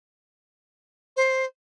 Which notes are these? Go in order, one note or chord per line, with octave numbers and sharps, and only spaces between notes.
C5